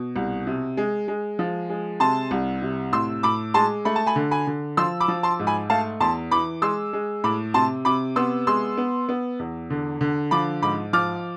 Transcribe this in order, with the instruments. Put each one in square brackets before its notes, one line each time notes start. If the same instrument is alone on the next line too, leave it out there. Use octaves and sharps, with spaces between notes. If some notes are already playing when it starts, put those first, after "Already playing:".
Already playing: [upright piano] B2
C2
C3
G#3
G#3
F3
G#3
C3 A5 C6
C2
C3
A2 C6 E6
A2 B5 D6
G#3 A5 C6
A3 B5
A5
G#5 B5
D3
G#5 B5
D3
F3 C6 E6
B5 D6
F3
A5 C6
G#2
G#5 B5
A3 F5 A5
E2 A5 C6
E3 B5 D6
G#3 C6 E6
G#3
A2 B5 D6
C3 A5 C6
C3 B5 D6
B3 C6 E6
G#3 C6 E6
B3
B3
E2
D3
D3
F3 B5 D6
G#2 B5 D6
F3 D6 F6